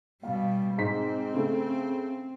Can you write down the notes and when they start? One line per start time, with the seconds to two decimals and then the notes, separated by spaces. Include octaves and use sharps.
0.23 B2 G3 F5
0.78 G#2 C4 B6
1.34 C#3 A3